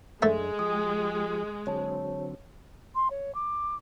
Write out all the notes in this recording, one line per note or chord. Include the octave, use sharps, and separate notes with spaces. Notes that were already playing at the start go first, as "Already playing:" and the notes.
F#2 G#3 A3 D4 E5
F3 G4 G#4 D#6
D3 F#3 C4 C#5 A5
C6
C#5
D6